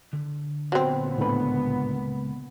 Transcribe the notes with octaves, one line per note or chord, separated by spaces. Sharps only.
D3
A#2 F#3 B3 C4
C#2 A2 D3 B4 B5